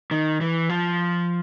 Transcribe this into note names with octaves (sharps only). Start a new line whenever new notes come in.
D#3
E3
F3